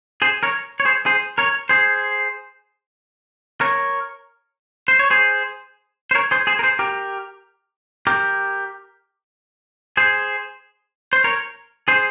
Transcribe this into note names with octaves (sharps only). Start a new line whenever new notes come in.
G#4 C5
A#4 C#5
C#5
G#4 C5
G#4 C5
A#4 C#5
G#4 C5
A#4 C#5
C5
C#5
G#4 C5
C5
A#4 C#5
G#4 C5
G#4 C5
A#4
G#4 C5
G4 A#4
G4 A#4
G#4 C5
C5
A#4 C#5
G#4 C5